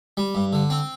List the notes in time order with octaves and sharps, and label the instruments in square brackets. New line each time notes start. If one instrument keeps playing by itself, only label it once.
[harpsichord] G3
G2
D3
C4